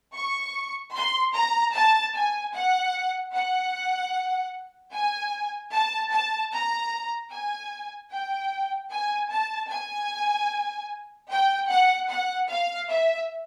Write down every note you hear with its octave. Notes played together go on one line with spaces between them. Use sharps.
C#6
C6
A#5
A5
G#5
F#5
F#5
G#5
A5
A5
A#5
G#5
G5
G#5
A5
G#5
G5
F#5
F#5
F5
E5